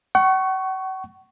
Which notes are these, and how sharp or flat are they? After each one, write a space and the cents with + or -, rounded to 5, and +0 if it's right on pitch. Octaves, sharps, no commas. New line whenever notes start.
F#5 +40 C#6 +0